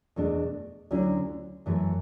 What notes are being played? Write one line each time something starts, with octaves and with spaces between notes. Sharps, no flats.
E2 B2 A3 D4
D2 D3 F#3 C#4 E4
F#2 E3 A3